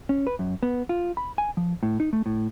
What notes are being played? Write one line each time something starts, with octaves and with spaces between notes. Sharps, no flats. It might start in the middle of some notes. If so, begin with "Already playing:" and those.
C#4
B4
F#2
B3
F4
B5
G#5
F3
A2
D#4
A3
A2